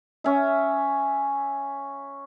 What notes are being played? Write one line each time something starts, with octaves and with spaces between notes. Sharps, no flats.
C#4 E5